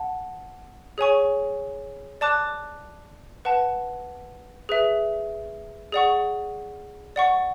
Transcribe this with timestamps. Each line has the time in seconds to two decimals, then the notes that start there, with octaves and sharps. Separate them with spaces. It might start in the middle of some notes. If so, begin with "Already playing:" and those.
Already playing: F#5 A5
0.98 G#4 C#5 G#5 C#6
2.21 D5 A5 D6 F#6
3.45 B4 F#5 A5
4.69 G#4 B4 E5
5.92 G#4 D5 F#5 C#6
7.16 D5 F#5 C#6